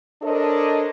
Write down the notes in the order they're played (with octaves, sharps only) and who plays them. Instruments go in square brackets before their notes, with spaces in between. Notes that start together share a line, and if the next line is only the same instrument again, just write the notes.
[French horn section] D4 A4 A#4 C5 C#5 D#5